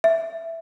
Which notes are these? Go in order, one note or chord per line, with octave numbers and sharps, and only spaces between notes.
E5